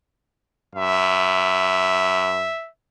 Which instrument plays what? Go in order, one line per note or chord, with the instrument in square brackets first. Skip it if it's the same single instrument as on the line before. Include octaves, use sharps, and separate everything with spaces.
[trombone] F#2 [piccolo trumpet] E5